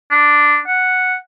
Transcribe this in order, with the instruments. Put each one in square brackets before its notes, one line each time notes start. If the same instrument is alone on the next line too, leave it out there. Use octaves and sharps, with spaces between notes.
[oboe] D4
F#5